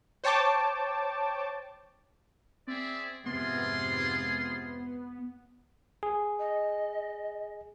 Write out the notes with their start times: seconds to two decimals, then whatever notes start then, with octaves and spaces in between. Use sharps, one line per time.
0.24 C5 C#5 G5 A5 D6
2.67 C4 G#4 D5 E5
3.26 F2 G#2 C3 B3 F4 G#4 C6
6.03 G#4
6.39 D#5